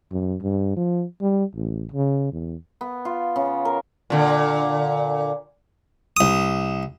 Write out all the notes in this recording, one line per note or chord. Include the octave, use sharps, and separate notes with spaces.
F#2
G2
F3
G3
A1
C#3
E2
B3
F4
C#3
A#4
A#2 D3
C2 D#6